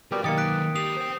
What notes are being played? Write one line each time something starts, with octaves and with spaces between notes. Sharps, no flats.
B2 G3 G4 A#4 D5
D#3 F#3 A#3 D#4 G4 D#6 A6 C#7
F#6 B6 D7
G3 D#6 C7 F7
C5 G5